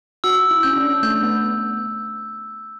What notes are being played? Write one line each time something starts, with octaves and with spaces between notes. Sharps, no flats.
F#4 E6
E4
C#4 G6
D4
A3 G6
B3